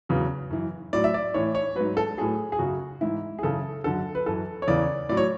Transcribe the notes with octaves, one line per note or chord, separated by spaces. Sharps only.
E2 C#3 F#3
F#2 E3
A2 F#3 D5
E5
D5
A2 E3 C#5
C#5
G#2 F#3 B4
A4
A2 F#3 G#4
G#4
F#2 C#3 F#3 F#4
G#2 E3 E4
G#4
F#2 C#3 E3 A4
F#2 D3 F#3 A4
B4
F#2 E3 A4
C#5
E2 C#3 E3 D5
A2 F#3 D5
C#5